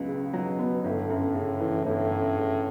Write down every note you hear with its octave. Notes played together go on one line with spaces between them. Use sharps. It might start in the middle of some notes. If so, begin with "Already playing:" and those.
Already playing: C#2 F#3 B3
C#3
B2 F#3
B3
G1 A2
F#2
C#3
E3
G1 A2
F#2
C#3